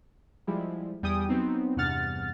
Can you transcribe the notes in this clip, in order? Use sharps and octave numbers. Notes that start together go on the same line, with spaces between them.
F3 G3 G#3 E4
E2 G3 G5 G#5 D#6
F#3 B3 C4 D#4
E2 G2 C3 F#5 F6 A6